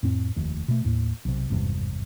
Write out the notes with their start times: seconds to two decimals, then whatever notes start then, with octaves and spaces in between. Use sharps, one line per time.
0.03 F2 A2 C4
0.36 F1 D#2
0.68 B2 A3
0.84 D#2 A2
1.25 B1 C3
1.50 G#1 E2 G2 C3